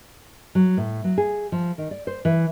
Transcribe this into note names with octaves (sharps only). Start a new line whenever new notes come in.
F#3
A2
F#3
G#4
F3
D#3
D5
C5
E3